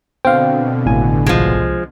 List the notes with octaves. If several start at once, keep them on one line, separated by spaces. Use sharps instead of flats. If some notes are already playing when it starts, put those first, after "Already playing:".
B2 D3 C4 F5 G5
G#1 A2 G#5
C2 F3 G#3